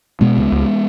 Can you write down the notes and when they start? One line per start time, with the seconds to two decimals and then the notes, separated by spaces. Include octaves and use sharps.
0.21 B2 G#3 B3
0.37 C#2
0.52 C#2